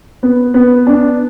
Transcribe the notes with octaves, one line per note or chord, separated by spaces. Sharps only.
B3
B3
D4